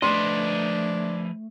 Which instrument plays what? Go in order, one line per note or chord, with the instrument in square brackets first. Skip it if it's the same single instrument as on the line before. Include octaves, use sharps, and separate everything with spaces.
[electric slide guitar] F3 B4 D#5 [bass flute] A3 [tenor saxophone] D4 [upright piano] C6